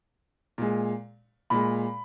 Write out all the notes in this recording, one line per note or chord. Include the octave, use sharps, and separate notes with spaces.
A#2 G#3
A#2 G#3 B5